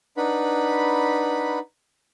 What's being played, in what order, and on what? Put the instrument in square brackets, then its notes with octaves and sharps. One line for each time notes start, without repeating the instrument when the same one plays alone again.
[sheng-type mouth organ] D4 D#4 B4 F#5 B5